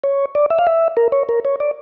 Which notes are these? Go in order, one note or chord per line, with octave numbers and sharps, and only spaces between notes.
C#5
D5
E5
F5
E5
A#4
C#5
A#4
C#5
D5